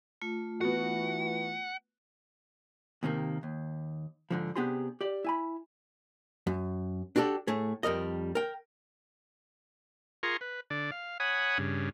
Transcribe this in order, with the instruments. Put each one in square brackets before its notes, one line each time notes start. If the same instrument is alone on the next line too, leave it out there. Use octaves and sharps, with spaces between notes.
[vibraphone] A3 F4
[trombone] E3 [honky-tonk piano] B3 F#4 [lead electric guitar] F#5
[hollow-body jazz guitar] D#2 C3 D#3 A#3
D#2
G#2 D3 F3
C3 B3 D4 G4 G#4 C6
G4 D5
E4 G#5 B5
F#2
D4 F#4 G4 A4 D5
A2 A3 G#4
F2 G3 A#4 D#5
A#4 G5
[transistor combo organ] F4 G#4 A#4 A#5 C6 C#6
B4
D3 D5
F5
C#5 F#5 G#5 B5 D#6
G2 C#3